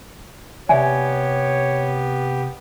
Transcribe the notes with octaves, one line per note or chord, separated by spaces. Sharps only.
C3 B3 G4 C#5 D5 E5 G#5